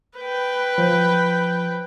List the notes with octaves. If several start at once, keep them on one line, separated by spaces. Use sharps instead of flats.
B4 G5
F3